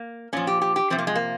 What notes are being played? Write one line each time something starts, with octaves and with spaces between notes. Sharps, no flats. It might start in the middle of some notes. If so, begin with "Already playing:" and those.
Already playing: A#3
A#2 F3 C#4
G4
G4
G4
C3 F3 C4
A#3
G#3
A#3